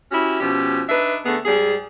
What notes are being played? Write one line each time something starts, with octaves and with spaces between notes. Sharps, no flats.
C#4 E4 F#4 G4
B2 F3 C#4 G4
D4 D#4 B4 E5
D3 A3 B3 G#4
G#2 G3 G#4